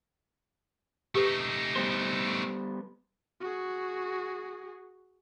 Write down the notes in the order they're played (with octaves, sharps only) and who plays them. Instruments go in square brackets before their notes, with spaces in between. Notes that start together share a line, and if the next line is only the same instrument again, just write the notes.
[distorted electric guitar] A3 D#4 [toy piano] G4 A4 B4
[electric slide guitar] G3 B3 C5
[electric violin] F#4 G#4